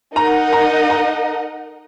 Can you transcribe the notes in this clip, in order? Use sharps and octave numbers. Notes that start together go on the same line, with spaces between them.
D#4 A#4 D#5 F#5 A#5
A#5
A#5